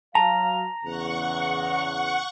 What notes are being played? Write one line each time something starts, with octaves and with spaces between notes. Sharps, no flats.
F#3 F5 A5 A#5
E2 C#3 F#5 C#6